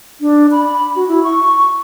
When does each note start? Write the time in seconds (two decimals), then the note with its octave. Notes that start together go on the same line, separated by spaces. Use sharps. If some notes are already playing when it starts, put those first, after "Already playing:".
0.21 D4
0.52 B5
0.96 F#4
1.08 E4
1.23 C#6